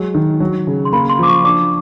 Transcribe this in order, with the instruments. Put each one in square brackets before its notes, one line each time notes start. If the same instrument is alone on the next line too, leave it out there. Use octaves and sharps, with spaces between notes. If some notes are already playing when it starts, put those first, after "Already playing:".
Already playing: [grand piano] F#3 G#3
D#3
F#3
C#3
[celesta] C6
[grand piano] A#3 [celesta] B5
[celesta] C6
[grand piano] F3 [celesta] D6
[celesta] C#6
[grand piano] D4 [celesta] D6